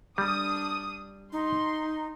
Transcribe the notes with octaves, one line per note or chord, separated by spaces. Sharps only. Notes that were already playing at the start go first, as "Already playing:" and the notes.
G3 D4 D#6
D#4 C6